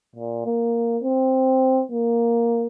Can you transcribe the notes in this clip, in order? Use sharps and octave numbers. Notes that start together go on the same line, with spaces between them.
A#2
A#3
C4
A#3